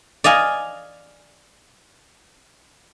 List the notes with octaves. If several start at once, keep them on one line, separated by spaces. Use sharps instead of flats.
D5 D#5 F5 G#5